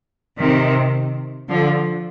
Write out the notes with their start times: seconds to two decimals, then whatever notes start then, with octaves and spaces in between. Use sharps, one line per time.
0.39 C3 D#3
1.48 D3 F3